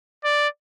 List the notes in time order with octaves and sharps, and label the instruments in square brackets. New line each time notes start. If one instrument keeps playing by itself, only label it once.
[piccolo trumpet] D5